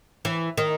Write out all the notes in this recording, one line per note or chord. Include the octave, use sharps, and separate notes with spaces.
E3
D#3